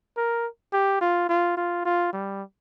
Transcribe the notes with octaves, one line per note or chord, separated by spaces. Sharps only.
A#4
G4
F4
F4
F4
F4
G3